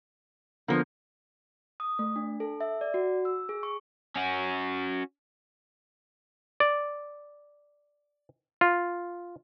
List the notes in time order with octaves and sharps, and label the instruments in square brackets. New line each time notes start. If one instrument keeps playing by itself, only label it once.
[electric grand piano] D3 B3 [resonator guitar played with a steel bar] F3 A#3
[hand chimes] D#6
A3
D4
A4
E5
D5
F#4
E6
G#4
C#6
[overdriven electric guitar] C#4 F#4
[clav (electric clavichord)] D5
F4